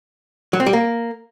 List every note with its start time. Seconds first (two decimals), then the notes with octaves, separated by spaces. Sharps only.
0.53 F#3
0.60 C4
0.66 G3
0.73 A#3